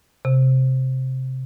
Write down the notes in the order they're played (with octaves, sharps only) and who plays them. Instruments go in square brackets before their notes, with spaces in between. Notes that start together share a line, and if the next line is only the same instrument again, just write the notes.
[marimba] C3